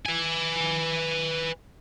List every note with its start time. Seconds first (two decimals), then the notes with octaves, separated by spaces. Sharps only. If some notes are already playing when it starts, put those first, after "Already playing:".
0.06 B4 G#5